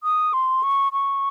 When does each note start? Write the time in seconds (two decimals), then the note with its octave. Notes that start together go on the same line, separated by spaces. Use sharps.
0.03 D#6
0.33 C6
0.63 C#6
0.92 C#6